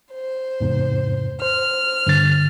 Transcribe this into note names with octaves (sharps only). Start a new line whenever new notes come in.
C5
E2 G#2 C3
C5 F6
G2 D3 A6